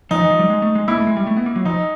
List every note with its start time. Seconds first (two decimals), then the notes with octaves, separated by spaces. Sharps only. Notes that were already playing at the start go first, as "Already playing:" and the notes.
0.11 F3 D#4
0.20 E3
0.31 F3
0.39 G3
0.50 G#3
0.62 A3
0.75 G#3
0.88 A#3 E4
0.97 A3
1.07 G#3
1.17 G3
1.27 A3
1.37 B3
1.46 A#3
1.56 F#3
1.65 F3 D#4